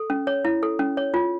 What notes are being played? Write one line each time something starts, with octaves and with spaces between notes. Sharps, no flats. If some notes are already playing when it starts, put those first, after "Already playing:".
Already playing: A4
C#4
C#5
E4
A4
C#4
C#5
F4